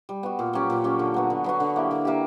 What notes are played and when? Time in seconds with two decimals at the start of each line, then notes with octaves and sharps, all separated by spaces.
0.09 G3
0.23 B3 F#4
0.39 A#2
0.53 F#3 C#4 G4
0.70 A#2
0.84 F#3 C#4 G4
0.99 D3
1.14 F#3 B3 F#4
1.30 D3
1.44 F#3 B3 F#4
1.60 D3
1.76 A#3 E4 G4
1.91 D3
2.05 A#3 E4 G4